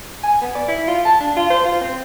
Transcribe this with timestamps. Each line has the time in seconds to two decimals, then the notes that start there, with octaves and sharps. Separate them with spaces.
0.23 G#5
0.41 B3
0.55 D5
0.68 E4
0.87 F4
1.05 A5
1.21 D4
1.36 F4
1.50 C5
1.66 F4
1.81 C4